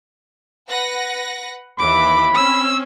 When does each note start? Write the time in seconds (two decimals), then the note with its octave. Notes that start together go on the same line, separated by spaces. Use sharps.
0.69 B4 F#5 A#6
1.78 D#2 E3 B5 D6
2.34 C4 C#4 E6